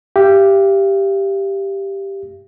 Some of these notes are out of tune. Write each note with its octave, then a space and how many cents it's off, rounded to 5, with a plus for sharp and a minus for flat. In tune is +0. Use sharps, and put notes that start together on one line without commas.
G4 +0 F5 -45